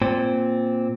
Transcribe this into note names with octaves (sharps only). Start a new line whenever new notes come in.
A#2 C4